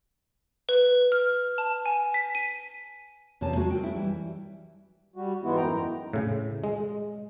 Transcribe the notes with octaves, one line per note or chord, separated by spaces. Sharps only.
B4
F6
A5
G#5
B6
D#7
E2 C3 A#3 C#4 A5
G#3 F#4
C4 A#4 B4 G5
E4
E3 G3
G3 F#4
G#2 E3 G#3 B3 E4 F#4
F#2 G5 A#5
A2 C#3
G#3